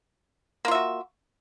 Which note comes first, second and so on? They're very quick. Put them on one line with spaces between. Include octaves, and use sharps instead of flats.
A#3 F4 E5 F#4